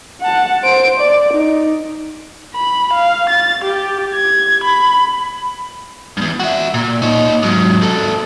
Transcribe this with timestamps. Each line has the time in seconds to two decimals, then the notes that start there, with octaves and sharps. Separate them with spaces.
0.21 F#5 A5
0.64 C5 D7
1.00 D5
1.33 D#4
2.55 B5
2.93 F5
3.29 A6
3.64 G4
4.14 G#6
4.64 B5
6.17 E2 G2
6.40 F#4 E5
6.74 A#2
7.02 D#4 C#5
7.42 G#2 F#3
7.81 D#2 A4